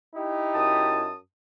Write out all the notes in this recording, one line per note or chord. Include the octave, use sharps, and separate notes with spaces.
D#4 E4 G4
F#2 A5 D#6